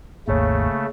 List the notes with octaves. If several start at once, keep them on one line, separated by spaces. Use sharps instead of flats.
G#1 D#2 C#3 A3 A#3 G#4 C#5